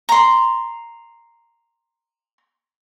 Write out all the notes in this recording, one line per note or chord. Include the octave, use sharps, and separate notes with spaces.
A#5 C6